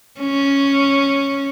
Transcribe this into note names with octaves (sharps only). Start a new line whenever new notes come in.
C#4